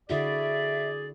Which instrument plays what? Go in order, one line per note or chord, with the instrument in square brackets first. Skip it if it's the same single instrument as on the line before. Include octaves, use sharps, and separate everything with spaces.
[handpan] D3 E4 F#4 [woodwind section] G#4 D5 [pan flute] E5